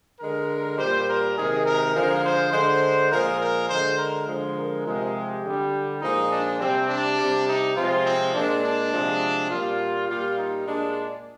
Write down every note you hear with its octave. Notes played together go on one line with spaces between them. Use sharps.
D3 G#3 A#4
A#2 G3 C5
A#4
C3 D#3 G#3 G#4
A#4
D3 F3 G#3 A#4
C5
D3 G#3 C5
A#2 F3 G#3 A#4
A#4
D3 G#3 C5
A#4
D3 F3 G#3
A#4
C3 F3 G#3
G4
D3 G3
A#2 F3 G#3 D#4
D4
C3 G3 C4
D4
C3 G3
D#4
C3 F3 G#3 F4
C4
A#2 G#3 D4
D4
C3 F3 G#3
A#2 G3 F4
A#2 G3 F4
D#4
A#2 G#3 D4